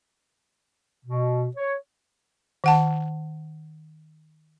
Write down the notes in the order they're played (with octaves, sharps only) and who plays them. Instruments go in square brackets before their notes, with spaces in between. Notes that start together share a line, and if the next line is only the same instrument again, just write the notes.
[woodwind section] B2
C#5
[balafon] D#3 F#5 A5